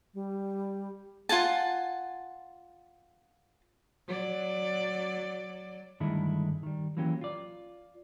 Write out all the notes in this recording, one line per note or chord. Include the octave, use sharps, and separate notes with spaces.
G3
F4 F#5 G#5 A5
F#3 D5
G2 D3 D#3 G#3 A3 E4
D#3 G3
E3 F#3 A#3 C#4 G4
F4 D5